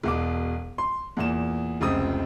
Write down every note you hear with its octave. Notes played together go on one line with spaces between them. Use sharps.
E1 B2 D6
C6
E2 A#2 E7
F1 C#2 C4 D#6